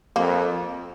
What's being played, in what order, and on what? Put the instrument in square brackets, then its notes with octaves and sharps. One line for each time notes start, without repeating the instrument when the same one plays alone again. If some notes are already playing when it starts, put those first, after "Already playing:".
[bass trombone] F2 [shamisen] A#3